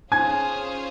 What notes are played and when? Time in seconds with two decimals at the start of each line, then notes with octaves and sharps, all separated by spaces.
0.12 C#4 F4 G#4 C5 F5 G#5 G#6